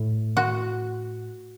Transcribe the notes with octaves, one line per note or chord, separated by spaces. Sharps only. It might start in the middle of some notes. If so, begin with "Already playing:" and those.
Already playing: A2
F#4